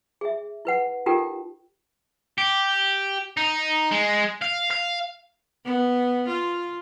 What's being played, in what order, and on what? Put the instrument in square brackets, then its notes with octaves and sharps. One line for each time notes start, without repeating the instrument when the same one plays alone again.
[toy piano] G#4 E5
E4 B4 F#5
D#4 F4 G4 A4 A#4 G5
[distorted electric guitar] G4
D#4
G#3
F5
F5
[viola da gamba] B3
F4